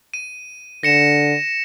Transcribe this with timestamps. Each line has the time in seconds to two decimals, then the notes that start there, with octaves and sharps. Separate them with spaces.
0.14 D#7
0.83 D3 A#6 C#7 E7